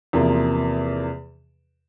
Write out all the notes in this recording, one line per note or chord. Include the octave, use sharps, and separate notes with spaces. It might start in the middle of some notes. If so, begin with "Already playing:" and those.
E2 C3 F3 A#3